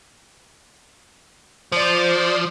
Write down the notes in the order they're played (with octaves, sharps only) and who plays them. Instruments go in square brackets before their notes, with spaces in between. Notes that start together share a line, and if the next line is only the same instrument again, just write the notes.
[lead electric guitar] F3 [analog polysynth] C5 D5